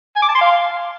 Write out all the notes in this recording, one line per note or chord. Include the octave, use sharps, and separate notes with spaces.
G#5
D6
A5
C6
F5